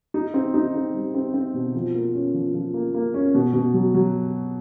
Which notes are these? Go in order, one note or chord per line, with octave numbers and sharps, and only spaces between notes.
D#4
C4
D#4
C4
G3
C4
C4
B2
F3
A#3
C#4
F3
F3
A#3
A#3
C#4
B2
B2
F#3
F#3